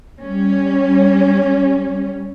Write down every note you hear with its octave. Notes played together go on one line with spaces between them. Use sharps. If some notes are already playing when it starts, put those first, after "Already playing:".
G3 C#4